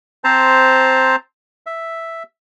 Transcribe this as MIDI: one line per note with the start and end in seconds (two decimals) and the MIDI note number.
0.24 1.16 60
0.24 1.16 72
0.24 1.16 81
0.24 1.16 82
1.66 2.23 76